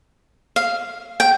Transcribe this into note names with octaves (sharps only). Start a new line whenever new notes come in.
F5
G5